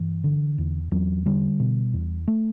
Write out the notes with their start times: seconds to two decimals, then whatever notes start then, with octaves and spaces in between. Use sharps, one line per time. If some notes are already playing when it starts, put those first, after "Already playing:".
Already playing: G2 E3
0.24 D3
0.58 E2
0.91 E2 F#3
1.26 D3 G3
1.60 B2
1.93 E2
2.28 A3